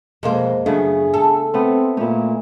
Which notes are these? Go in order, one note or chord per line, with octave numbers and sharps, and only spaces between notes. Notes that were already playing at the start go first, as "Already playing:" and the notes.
F2 B2 G#3 A#3 C5
F#2 C#3 A3 B3 D4 F#4 G#4
A4
A3 B3 C4 C6
A#2 A3 C#4 E4 A4